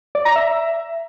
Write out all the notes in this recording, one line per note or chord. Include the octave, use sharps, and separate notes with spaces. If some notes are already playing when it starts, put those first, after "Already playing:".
D5
A#5
E5